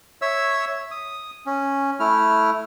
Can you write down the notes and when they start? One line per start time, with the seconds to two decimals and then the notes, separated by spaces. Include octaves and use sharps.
0.22 C#5 E5 E6
0.91 D#6
1.46 C#4
2.00 A3 E4 F6